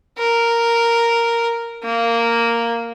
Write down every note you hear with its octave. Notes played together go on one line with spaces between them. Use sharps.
A#4
A#3